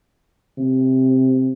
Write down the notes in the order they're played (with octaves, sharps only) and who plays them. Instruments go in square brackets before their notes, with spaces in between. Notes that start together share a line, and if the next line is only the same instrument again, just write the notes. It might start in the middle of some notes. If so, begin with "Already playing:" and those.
[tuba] C3